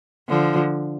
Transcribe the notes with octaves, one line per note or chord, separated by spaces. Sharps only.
D3 F3